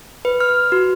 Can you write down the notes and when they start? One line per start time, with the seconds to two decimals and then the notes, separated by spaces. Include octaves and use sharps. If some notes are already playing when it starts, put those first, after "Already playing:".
0.25 B4
0.40 F6
0.72 F#4